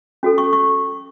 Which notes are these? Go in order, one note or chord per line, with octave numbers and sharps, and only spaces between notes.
C#4 F#4 A4
C#6
C#6